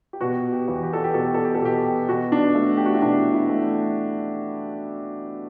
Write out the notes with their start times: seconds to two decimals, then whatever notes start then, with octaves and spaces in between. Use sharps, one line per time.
0.13 G4
0.21 B2 F#4
0.52 G4
0.68 E2
0.83 G4
0.93 A4
1.04 G4
1.14 B2 A4
1.24 G4
1.34 A4
1.45 G4
1.55 A4
1.61 B2 G4
2.08 B2 F#4
2.32 D4
2.55 A3
2.77 G4
2.85 F#4
2.94 E4
3.02 B2 D4
3.33 E4
3.49 A3